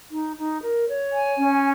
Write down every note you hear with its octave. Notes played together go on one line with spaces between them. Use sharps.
D#4
D#4
A#4
C#5
G#5
C#4